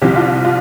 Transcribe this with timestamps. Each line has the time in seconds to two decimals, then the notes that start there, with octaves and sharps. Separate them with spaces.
0.02 C2 C3 F3 G4
0.16 F4
0.44 F4